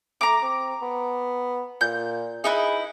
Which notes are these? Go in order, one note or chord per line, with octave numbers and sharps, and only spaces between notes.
A3 A#5 D6
C4
B3
A#2 G6
D#4 E4 G#4 B4